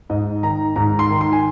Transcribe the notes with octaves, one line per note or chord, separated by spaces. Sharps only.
G#2 D#5
D#3 A#5
G#2 A#5
C6
D#3
C6
G#5